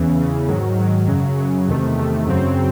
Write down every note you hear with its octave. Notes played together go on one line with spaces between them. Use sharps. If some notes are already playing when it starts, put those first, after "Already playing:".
Already playing: E2 C#3 E3
E2 C#3 E3
G#2 D#3 F#3
G#2 D#3 F#3
F#2 C#3 F#3
F#2 C#3 F#3
E2 C3 D#3 A3
E2 C3 D#3 A3
F#2 C#3 F#3 C4